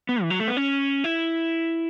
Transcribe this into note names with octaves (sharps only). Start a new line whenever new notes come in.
B3
E3
F#3
A3
B3
C#4
E4